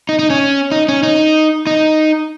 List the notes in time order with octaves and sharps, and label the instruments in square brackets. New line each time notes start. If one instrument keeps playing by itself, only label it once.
[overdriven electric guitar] D#4
D#4
C#4
D#4
C#4
D#4
D#4